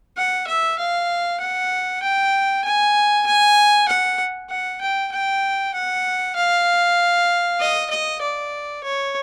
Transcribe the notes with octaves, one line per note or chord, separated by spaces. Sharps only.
F#5
E5
F5
F#5
G5
G#5
G#5
F#5
F#5
G5
G5
F#5
F5
D#5
D#5
D5
C#5